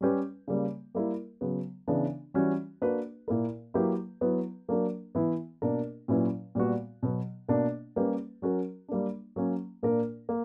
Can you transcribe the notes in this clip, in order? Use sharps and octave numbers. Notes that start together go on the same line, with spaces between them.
G3 C#4 G4 B4
C#3 G3 A#3
G3 A#3 E4 A#4
C#3 F#3 B3
C#3 E3 B3 D4
E3 G3 C#4 F#4
A#3 D4 F#4 B4
A#2 A#3 E4 A#4
F#3 A#3 E4 G4 B4
F#3 B3 E4 B4
F#3 A#3 D4 A#4
E3 B3 E4
B2 A#3 D4 A#4
A#2 F#3 C#4 E4 B4
A#2 G3 B3 F#4
B2 F#3 B3
B2 A#3 D4
G3 A#3 C#4 G4 B4
F#3 C#4 F#4 A#4
G3 A#3 D4
F#3 A#3 C#4
A#2 A#3 D4 A#4
A#3